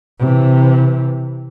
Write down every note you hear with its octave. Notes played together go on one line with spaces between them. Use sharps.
C3 E3